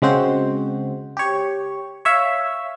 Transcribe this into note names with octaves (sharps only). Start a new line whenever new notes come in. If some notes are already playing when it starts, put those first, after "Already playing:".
C#3 G#3 C4 F#4 C5
G4 C#5
C#5 E5 F5